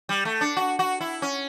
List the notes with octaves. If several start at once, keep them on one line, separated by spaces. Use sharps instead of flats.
G3
A3
D4
F#4
F#4
E4
C#4